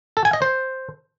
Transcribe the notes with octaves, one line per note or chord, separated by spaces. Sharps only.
A4
G#5
D#5
C5